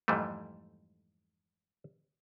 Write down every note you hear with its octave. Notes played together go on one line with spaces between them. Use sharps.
F2 G#2 E3 G3 A3